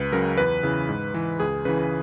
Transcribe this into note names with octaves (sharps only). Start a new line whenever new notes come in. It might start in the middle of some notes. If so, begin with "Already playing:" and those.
Already playing: C#2 B4
C#3 F#3 A#4
E2 B4
C#3 E3
G#2
E3
C#2 G#4
C#3 E3 B4